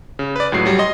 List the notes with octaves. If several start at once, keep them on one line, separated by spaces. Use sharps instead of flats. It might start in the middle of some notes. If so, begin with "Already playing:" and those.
C#3
B4 D5
C#2 A2 F#3 C7
F#3 G3
D#5 C6